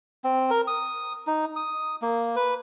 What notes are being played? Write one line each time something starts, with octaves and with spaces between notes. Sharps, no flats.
C4
A#4
D#6
D#4
D#6
A#3
B4